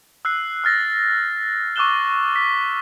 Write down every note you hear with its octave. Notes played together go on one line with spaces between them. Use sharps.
E6 F#6 C7
E6 F6 A6 A#6
C#6 D6 E6 F#6 E7 G7
B6